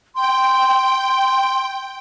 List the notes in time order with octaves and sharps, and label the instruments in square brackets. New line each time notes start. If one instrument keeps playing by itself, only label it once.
[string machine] G5 [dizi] C6